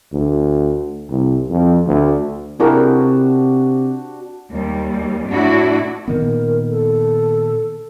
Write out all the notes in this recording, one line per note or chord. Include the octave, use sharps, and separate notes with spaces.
D2
C2
F2
D2
C3 D4 E4 F#4 G#4 A#4 G5
D#2 G3
A2 D4 E4 F#4
A#2 D#3 B3 A#4
A4